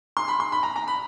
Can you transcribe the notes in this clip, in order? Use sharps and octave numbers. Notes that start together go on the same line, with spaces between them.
C6
B5
C6
B5
A#5
A#5
B5